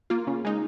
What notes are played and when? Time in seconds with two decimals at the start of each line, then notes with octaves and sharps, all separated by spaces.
0.10 A#3 F4
0.27 C#3
0.45 G#3 D#4